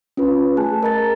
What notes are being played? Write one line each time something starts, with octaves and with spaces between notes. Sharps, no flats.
C#4 F4 B4
A3 G#4 G#5 A5 F#6
A#4 D#5 A#5 A6